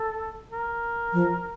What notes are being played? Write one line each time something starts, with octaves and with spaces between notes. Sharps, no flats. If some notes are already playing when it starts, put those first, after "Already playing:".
Already playing: A4
A#4
F3